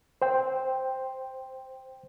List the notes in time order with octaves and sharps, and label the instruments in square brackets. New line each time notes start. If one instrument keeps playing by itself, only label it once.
[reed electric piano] C5 G5